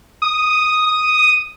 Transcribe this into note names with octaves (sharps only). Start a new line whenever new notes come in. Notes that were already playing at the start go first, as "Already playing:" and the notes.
D#6